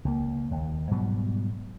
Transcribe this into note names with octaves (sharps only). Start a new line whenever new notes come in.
C#2 A#3
D#2
G#2 B2 F#3 G3